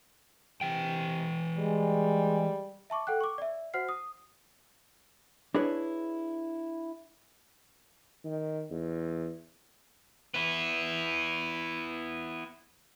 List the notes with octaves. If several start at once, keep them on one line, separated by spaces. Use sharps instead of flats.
C3 E3 G5
G3 G#3
E5 A5 C#6 D6
A4 F#5 G5 F#6
C#6 D6
D5 E5
F#4 C5 F#5 F6 C7
D#6
D4 E4 G#4 B4 C#5
D#3
E2
B3 E4